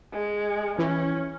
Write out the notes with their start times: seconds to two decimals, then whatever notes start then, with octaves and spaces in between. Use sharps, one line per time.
0.13 G#3
0.79 E3 C#4